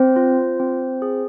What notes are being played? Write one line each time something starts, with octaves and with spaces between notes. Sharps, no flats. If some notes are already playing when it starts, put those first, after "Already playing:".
Already playing: C4 C5
F4
C4
G#4